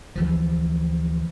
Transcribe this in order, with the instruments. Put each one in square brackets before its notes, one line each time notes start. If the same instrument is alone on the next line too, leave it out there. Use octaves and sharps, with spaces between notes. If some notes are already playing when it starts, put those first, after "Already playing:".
[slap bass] D2 E3 F3